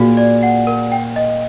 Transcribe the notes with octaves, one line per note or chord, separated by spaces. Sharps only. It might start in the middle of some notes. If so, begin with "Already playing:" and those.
Already playing: A#2 F#4 G#4
D5
F#5
A#4
G5
D#5